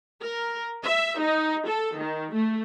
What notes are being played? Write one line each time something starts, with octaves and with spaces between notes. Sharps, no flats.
A#4
E5
D#4
A4
D#3
A3